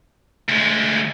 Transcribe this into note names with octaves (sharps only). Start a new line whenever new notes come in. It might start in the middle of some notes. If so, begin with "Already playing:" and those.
D2 G#3